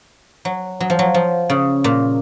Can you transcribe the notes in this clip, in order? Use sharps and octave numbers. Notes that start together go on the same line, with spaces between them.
F#3
F#3
F3
F#3
F3
C#3
A#2